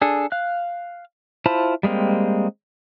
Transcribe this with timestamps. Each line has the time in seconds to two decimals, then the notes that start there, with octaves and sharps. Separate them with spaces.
0.02 D4 G#4 A4
0.32 F5 F#6
1.46 E4 F4 C5 A5 B5
1.83 G3 G#3 A#3 C4